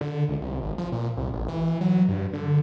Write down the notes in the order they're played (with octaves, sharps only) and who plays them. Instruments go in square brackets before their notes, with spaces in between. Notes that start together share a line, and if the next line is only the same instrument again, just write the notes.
[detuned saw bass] D3
C#2
C2
G#1
F3
A#2
C2
A1
E3
F#3
G2
D3